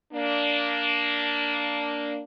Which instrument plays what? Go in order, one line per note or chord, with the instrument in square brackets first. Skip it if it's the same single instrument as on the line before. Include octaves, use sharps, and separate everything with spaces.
[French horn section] A#3 D4